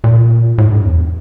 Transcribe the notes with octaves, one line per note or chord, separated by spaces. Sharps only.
A#2
A2
G2
E2